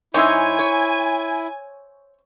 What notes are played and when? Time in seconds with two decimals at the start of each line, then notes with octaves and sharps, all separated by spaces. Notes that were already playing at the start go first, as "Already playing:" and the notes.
0.14 F#2 D#4 E4 C5 C#5 E5 G#5
0.59 C#5